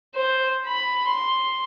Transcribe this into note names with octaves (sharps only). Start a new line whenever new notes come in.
C5
B5
C6